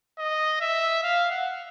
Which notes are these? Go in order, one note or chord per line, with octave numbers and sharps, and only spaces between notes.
D#5
E5
F5
F#5